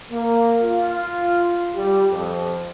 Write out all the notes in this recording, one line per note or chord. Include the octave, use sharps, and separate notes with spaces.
A#3
F4
G3
F2